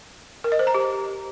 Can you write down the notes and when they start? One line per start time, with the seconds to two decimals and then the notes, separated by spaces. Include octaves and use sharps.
0.44 A#4
0.52 D#5
0.59 C5
0.67 A#5
0.74 G4